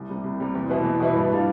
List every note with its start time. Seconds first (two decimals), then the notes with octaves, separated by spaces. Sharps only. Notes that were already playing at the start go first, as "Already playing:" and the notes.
Already playing: C2
0.09 C3 G3
0.24 C2
0.40 C3 G3
0.55 E2
0.69 B2 B3 E4 B4
0.85 E2
1.00 B2 B3 E4 B4
1.16 G2
1.31 E3 G3 D4 F4